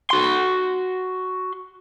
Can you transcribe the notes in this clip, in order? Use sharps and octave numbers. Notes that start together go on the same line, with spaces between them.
F#4 C6